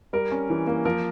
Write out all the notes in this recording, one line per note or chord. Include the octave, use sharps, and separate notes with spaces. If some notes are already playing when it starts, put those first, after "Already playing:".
G3 A#4
C#4
E3
A#3
F3 A#4